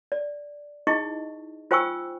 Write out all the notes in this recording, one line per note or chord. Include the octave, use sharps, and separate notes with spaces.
D5
D#4 E4 G#4 D#5 C#6
F4 C5 G5 G#5 C#6 E6